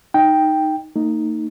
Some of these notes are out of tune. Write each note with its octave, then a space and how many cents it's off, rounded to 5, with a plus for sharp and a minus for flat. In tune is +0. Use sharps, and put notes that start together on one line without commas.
D#4 +0 G5 +0
A#3 -45 D#4 +0